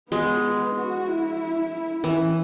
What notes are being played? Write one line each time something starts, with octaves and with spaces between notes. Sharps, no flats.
G#3 B3
F#4
E4
E3 C#4